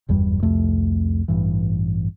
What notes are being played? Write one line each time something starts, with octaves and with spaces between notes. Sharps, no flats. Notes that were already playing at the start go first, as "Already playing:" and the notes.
F#1 E2 G2 G3
C2 F2 A3
A1 G2 E3